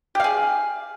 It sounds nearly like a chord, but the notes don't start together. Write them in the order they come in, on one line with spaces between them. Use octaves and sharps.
G4 F5 G#4